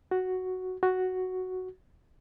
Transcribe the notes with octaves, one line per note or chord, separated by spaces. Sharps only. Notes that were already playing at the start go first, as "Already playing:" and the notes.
F#4
F#4